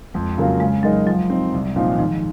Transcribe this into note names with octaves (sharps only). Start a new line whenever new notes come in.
F2 G#3
C#3 F#3 A#3 F4
C#3 G#3
F#3 G#3 D#4 A#4 D#5
F3 F#3
C4 D#4
C2
A#2 F3 C4 D#4
D#3
G#2 F3